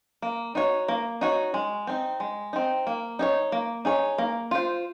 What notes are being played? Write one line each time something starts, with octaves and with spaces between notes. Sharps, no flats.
A#3
D#4 F#4 C#5
A#3
D#4 F#4 C#5
G#3
C4 D#4
G#3
C4 D#4
A#3
D#4 G#4 C#5
A#3
D#4 G#4 C#5
A#3
F4 C5